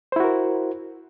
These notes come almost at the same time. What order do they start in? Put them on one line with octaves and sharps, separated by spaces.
C5 E4 F#4 A#4